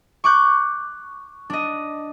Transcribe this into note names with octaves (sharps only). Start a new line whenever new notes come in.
C#6 D6 F#6 G6
D4 D#5